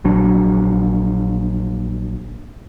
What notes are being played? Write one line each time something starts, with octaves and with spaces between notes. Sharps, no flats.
A#1 F#3 D4